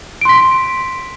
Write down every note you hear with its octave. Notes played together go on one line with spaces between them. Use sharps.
C6 B6 D7